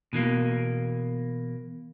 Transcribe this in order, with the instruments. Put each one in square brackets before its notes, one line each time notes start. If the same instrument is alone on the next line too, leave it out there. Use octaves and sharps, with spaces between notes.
[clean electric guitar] B2 E3 A#3